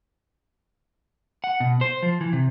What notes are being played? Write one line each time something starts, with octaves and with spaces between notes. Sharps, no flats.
F#5
B2
C5
F3
E3
C3